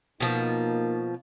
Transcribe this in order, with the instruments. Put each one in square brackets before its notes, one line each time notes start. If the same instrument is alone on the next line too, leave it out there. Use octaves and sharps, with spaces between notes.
[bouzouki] B2 F3 [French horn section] A#3 D#4